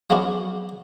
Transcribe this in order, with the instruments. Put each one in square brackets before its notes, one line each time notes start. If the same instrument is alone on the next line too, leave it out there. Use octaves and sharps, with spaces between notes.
[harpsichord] F3 F#3 G#3 B3 C#4 D4